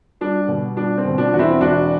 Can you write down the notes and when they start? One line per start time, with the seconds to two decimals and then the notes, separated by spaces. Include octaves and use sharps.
0.21 G3 D4
0.48 B2
0.76 G3 D4
0.98 C4
1.05 B2
1.18 D4
1.33 E2 F#4
1.39 C4 E4
1.60 E1 D4 F#4